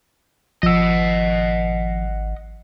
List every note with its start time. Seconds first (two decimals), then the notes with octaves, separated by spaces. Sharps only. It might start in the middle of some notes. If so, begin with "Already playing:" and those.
0.63 G#1 F3 D#5 F#5 E6